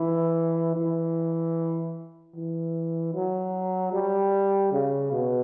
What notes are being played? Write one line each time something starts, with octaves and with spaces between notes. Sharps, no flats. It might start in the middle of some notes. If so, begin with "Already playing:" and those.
Already playing: E3
E3
E3
F#3
G3
C#3
B2